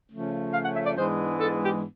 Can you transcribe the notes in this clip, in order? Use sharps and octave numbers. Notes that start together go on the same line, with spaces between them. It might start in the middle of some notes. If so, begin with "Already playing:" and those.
C#3 F3 A3 C#4
F5
F#5
E5
D5
G#2 E3 G#3 B3 D4 C5
A4
G4